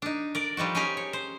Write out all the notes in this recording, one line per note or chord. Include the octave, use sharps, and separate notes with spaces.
D4 D#4
A#4 D5
F3 G3 D#4 F#4
C#4 D#4 G4 G#4 G#5 A#5
C#5
C5